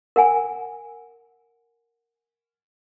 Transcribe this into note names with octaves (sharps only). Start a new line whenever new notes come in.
A#4 F#5 G#5